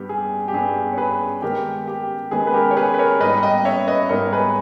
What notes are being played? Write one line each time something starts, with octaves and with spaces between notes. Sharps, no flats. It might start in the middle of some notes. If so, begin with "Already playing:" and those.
Already playing: G2 G3 B3 G4
G#4
G4
G2 G3 B3 G#4
C#5
G#4 B4
D#3 G#3 B3 G4 A#4
G4
D#3 G#3 B3 G#4
B4
G4 A#4
C#5
G#4 B4
B4
A#4 C#5
G#2 G3 B3 D#4 B4 D#5
D#5 G5
C#5 E5
B4 D#5
G#2 G3 B3 D#4 A#4 C#5
G#4 B4